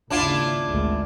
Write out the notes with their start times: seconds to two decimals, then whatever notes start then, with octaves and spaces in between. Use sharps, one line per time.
0.10 G#1 D#2 C#3 D4 E4 F4
0.67 G#1 D2 G#3